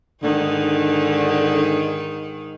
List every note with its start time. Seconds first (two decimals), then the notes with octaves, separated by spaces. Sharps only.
0.23 G#2 D3 D#3 D#4